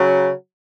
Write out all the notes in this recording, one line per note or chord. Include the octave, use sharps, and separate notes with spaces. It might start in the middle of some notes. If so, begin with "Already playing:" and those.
Already playing: C#3 F#3